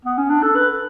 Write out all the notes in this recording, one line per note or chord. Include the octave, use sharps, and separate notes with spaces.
B3
C#4
D4
A4
B4